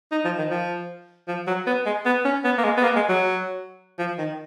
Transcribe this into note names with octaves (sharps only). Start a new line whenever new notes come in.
D#4
F3
D#3
F3
F3
F#3
B3
G#3
B3
C#4
B3
A#3
G#3
B3
A#3
G#3
F#3
F3
D#3